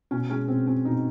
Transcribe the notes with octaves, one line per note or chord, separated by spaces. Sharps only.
B2 C#4
G#3 C#4
B2 C4
C4 C#4
B2 D#4